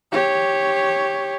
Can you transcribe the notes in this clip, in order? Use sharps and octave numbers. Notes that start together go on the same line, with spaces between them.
G4 C#5